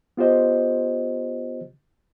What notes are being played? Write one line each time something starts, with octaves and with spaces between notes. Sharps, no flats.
B3 F4 G4 C5 D#5